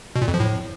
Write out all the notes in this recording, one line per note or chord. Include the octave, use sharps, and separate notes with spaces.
B2
A#2
F2
F3
A2